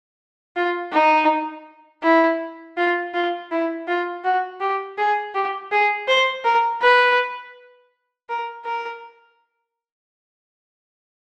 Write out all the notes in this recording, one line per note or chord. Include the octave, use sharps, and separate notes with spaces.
F4
D#4
E4
F4
F4
E4
F4
F#4
G4
G#4
G4
G#4
C5
A#4
B4
A#4
A#4